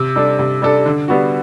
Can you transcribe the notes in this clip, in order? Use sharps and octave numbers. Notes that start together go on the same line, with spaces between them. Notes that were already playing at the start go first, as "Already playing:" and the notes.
Already playing: C3
G3 D4 A4
C3
G3 D4 A4
D3
G3 B3 F#4